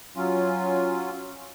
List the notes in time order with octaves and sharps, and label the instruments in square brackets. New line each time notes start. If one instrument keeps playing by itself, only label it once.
[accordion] F#3 C#4 F4